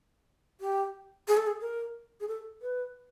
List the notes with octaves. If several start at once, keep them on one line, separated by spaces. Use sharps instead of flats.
G4
G#4
A4
G#4
A#4
G#4
A4
B4